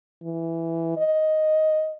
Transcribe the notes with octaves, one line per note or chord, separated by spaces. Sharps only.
E3
D#5